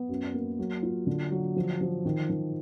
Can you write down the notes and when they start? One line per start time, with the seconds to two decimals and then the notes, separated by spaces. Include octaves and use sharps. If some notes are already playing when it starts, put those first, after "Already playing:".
Already playing: B3
0.09 F#2
0.34 A#3
0.59 F#3
0.83 F4
1.07 D3
1.31 F#3
1.56 F3
1.81 F3
2.05 D#3
2.29 D#3